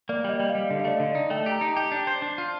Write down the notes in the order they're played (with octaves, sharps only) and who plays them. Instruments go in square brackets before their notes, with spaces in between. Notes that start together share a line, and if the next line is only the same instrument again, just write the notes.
[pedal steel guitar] A#3 [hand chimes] D5
[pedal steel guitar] G3 [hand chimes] D#5
[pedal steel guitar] G3
[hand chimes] F5
[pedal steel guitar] G3
[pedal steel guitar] D3 [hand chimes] F5
[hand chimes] D#5
[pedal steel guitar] A3 [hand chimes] D5
[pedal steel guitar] D3 [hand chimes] D#5
[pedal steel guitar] D#4
[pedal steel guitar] A3 [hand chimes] G5
[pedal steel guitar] G4
[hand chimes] A#5
[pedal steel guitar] D#4
[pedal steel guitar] G4 [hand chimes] A5
[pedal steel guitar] D4
C5
D4
F4